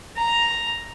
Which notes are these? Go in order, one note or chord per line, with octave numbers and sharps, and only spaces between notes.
A#5